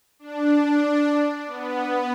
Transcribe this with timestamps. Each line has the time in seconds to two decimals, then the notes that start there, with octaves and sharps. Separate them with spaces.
0.19 D4
1.47 B3